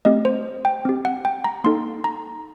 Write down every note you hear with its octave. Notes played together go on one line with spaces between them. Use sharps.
A3 C4 G4 D#5
C5
G5
C4 G4
F#5
G5
A#5
A#3 D#4 A4 C6
A#5